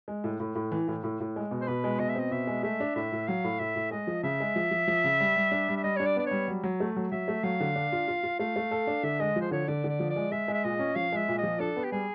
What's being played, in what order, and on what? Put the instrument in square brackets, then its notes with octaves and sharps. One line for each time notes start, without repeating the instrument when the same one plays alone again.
[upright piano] G#3
A2
A2
A2
E3
A2
A2
A2
G#3
B2
[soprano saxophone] C5
[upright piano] B2 [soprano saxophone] B4
[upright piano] G#3
[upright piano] B2 [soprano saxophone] D#5
[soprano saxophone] E5
[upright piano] C4 [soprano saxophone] D#5
[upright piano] B2 [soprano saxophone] E5
[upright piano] G#3
[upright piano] A3 [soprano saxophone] E5
[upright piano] D4
[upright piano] A2 [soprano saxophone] E5
[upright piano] A2
[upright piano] F#3 [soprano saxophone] F5
[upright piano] A2
[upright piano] A2 [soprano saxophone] E5
[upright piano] A2
[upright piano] G#3 [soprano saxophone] D#5
[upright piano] F3
[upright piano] C#3 [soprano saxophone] E5
[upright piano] G#3
F3
F3
F3
C#3
G3
G3
D4
G3
[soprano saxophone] E5
[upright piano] G3 [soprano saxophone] D#5
[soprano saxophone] C#5
[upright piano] D4
[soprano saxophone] D5
[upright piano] B3 [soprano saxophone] D5
[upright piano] G3 [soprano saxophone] C#5
[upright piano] F#3
F#3
A3
F#3
[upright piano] F#3 [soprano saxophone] E5
[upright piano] A3
[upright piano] F#3 [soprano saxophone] F5
[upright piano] D3
D4
F4
F4
F4
[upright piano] A3 [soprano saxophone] F5
[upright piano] A3
A4
D4
[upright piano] D3 [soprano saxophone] E5
[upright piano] G#3 [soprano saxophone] D#5
[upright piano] F3
[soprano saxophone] C5
[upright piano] D3 [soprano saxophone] C#5
[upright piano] D3 [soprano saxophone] D5
[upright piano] D3 [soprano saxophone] D5
[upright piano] F3
[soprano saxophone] D5
[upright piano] G#3
[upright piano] G#3 [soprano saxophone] E5
[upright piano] G#3
[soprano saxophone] E5
[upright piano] A#2 [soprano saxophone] D#5
[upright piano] C#4
[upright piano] F3 [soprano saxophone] F5
[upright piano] G#3 [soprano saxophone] E5
[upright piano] A#2
[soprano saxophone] D#5
[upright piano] F3
[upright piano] D4 [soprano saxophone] A4
[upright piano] B3
[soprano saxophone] G4
[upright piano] G3 [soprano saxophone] G#4